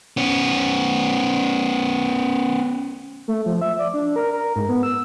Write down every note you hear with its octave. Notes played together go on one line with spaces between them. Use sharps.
B3 C#4
A3
F3
E5
D5
D4
A#4
A#4
G#2
B3
E6